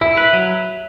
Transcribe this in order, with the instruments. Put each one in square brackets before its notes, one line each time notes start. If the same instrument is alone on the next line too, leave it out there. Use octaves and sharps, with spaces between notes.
[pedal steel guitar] E4 [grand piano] E5
[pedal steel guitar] B4
F#3